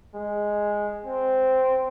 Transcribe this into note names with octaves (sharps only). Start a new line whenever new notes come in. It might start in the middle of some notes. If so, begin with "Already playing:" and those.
G#3
C4